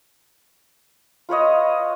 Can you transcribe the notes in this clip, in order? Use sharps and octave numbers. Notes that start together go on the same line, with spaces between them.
F4 B4 C#5 D#5